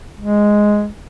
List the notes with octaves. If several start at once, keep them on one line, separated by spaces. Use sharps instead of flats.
G#3